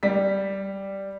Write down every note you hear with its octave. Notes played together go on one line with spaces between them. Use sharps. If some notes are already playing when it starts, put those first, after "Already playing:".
G3 B6